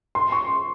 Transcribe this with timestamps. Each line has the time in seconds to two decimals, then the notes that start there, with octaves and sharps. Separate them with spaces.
0.15 C6
0.32 C#6